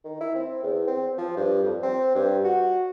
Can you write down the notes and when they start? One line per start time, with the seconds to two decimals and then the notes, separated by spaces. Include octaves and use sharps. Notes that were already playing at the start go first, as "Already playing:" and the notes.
0.04 D#3
0.20 E4
0.35 C4
0.63 E2
0.87 C4
1.17 F3
1.37 G2
1.63 F2
1.83 C4
2.15 G2
2.44 F#4